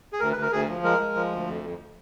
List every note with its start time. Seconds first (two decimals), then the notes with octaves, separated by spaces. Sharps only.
0.13 G#4
0.20 D2 A#4
0.32 D2 B4
0.42 A#4
0.52 D2 G#4
0.68 F3
0.84 G#3 A#4
1.00 G#3
1.15 F3
1.32 D2
1.47 F2
1.63 F2